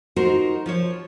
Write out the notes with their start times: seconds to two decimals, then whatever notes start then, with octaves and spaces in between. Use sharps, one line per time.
0.16 D#4 F4 F#4 A#4 C5
0.66 F3 C5 C#5